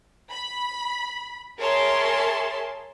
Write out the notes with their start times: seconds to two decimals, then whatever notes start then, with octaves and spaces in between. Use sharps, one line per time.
0.31 B5
1.60 G#4 A#4 C#5 E5 A5 C6